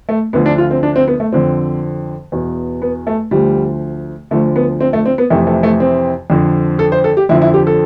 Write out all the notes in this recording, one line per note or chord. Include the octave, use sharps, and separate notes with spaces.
A3
D2 D3 F3 B3
D4
F4
C4
D4
C4
B3
A3
F2 D3 F3 C4
E2 B2
B3
A3
D2 D3 F3 G3
D2 D3 F3 A3
B3
C4
A3
C4
B3
F2 C3 E3 A3
A3
A3
C4
F2 D3 F3
A4
C5
A4
G4
F2 D3 F3 E4
E4
G4
A4